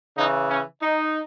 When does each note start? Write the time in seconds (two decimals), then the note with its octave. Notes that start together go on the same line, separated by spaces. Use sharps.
0.16 C#3 E3 D#4
0.48 C#4
0.81 D#4